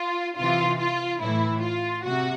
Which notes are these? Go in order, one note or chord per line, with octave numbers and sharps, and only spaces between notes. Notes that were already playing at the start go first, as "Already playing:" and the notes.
Already playing: F4
C3 E3 F4
F4
A2 E3 E4
F4
C3 F#4